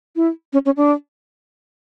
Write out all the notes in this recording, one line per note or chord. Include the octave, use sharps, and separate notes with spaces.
E4
C#4
C#4
D4